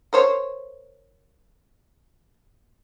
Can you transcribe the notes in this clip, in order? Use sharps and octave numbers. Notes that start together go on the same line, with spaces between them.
A#4 C5 C#5